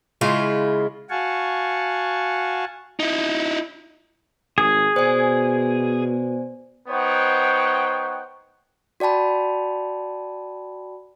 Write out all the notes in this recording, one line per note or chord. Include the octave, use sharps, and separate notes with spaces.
C#3 G#3 E4 F4
F#4 F5 F#5 G#5 A5 C#6
D#4 E4
G#1 G#4
B2 C5 D5 G#5
B3 D#4 C5 C#5 F#5 G5
F#4 D5 G5 A5 B5